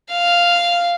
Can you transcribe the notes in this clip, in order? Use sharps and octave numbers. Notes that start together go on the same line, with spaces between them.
F5